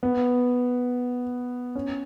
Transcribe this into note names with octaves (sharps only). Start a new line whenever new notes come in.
B3
C#4